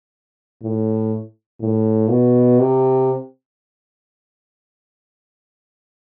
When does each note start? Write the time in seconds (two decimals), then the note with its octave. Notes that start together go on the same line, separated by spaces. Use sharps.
0.63 A2
1.61 A2
2.09 B2
2.60 C3